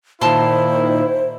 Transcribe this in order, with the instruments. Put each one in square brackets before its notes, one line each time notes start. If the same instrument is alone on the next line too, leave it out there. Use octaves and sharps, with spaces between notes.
[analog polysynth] A#2 D#3 [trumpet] E4 [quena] C5 [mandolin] A5 C6